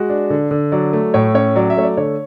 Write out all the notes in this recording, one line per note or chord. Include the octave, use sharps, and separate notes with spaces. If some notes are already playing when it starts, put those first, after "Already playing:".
Already playing: G#3 F#4
D4
D3
D3
F#3 D5
A3
A2 C#5
C#4 C#5
F#3 D5
E5
A3 C#5
D5
D3 C#5